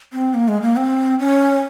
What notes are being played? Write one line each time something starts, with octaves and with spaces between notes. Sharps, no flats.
C4
A#3
G#3
A#3
C4
C#4